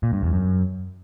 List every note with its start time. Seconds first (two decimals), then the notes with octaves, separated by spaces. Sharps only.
0.03 A#2
0.13 G2
0.23 E2
0.33 F#2